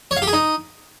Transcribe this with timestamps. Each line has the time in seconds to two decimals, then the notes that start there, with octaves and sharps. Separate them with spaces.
0.11 C#5
0.17 F5
0.22 G4
0.28 G#4
0.33 D#4